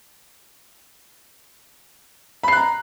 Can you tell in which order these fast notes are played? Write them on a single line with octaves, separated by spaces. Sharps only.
B5 C7 F#6 A#5